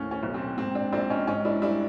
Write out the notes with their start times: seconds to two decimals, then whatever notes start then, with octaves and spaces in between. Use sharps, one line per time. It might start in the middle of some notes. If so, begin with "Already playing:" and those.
Already playing: D#2 A2 C#4
0.11 C#4
0.23 B1
0.34 C4
0.58 G#2 C4
0.75 C4 D4
0.93 A#1 C4 D4
1.09 C#4 D#4
1.27 G#2 C#4 D#4
1.45 D4 E4
1.62 G3 D4 E4